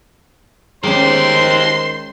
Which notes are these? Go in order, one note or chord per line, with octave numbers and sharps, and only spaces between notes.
D#3 G#3 C#4 G4 A#4 C5 C6